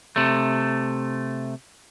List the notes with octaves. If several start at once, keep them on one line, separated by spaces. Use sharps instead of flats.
C3 A3